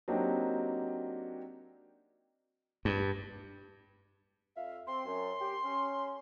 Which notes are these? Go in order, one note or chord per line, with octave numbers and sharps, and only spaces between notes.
F#3 A#3 C4 D4 D#4 G4
G2
F2 E5 F5
C4 C6
F#2
G4
C#4